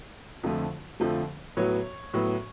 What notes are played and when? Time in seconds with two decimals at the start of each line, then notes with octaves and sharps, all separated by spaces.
0.43 F2 D3 F3 A3
1.00 F2 D3 F3 A3
1.57 A2 F#3 B3 C#5
2.14 A2 F#3 B3